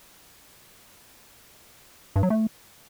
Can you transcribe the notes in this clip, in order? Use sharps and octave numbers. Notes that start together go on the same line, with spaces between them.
G2
F#3
A3